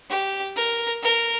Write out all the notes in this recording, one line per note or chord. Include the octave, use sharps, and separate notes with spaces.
G4
A#4
A#4